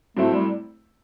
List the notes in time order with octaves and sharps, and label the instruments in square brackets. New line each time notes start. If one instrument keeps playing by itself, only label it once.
[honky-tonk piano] A2 F#3 C4 E4 [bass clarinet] A3
[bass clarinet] G3